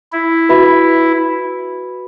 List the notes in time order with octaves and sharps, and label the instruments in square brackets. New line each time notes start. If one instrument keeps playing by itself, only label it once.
[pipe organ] E4
[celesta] F#4 B4 E5 B5